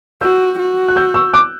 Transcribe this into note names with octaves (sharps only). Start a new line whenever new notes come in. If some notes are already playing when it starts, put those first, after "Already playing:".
F#4 E6 G6
F#4
F#6
E6 G6
C#6 E6
D6 F#6